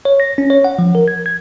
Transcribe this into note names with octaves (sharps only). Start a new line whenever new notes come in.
C#5
A#6
C#4
C#5
F#5
F3
A#4
G#6
G#6